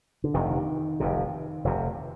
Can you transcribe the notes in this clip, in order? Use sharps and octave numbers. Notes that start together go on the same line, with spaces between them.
D3
F1 F2 C3 D#3
F1 F2 C3
F1 F2 C3